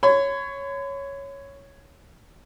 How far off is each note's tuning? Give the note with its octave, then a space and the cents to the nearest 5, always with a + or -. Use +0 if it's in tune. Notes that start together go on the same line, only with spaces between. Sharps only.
C#5 +0 B5 +45